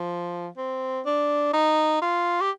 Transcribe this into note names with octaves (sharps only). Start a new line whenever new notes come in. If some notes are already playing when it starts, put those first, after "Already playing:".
Already playing: F3
C4
D4
D#4
F4
G4